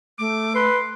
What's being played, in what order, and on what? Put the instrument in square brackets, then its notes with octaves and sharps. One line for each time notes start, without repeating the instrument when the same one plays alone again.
[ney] A3 [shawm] D6
[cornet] B4 [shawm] C6